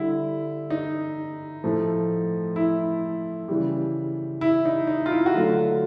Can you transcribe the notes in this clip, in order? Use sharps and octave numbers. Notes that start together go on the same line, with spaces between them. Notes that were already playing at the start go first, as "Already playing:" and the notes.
Already playing: D3 G3 E4
D#4
A2 F3 A3
E4
C#3 E3 G3
E4
D#4
D#4
F4
E4
F#4
D3 F#3 A3 F4